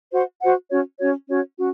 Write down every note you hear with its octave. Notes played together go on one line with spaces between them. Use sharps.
F#4 C5 F#5
F#4 C5 F#5
C#4 F#4 C#5
C#4 F#4 C#5
C#4 F#4 C#5
C#4 F#4